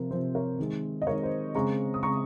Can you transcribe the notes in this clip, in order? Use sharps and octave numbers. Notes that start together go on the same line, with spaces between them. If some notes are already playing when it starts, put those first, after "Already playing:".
Already playing: C3 F3 C4 A#4
C3 F3 C4 C5
A#4 C#5
D#3 G#3 C4
D#5
D#3 G#3 C4 A#4 C#5
C5
C#3 G#3 C4 A#5 C#6
D#6
C#3 G#3 C4 A#5 C#6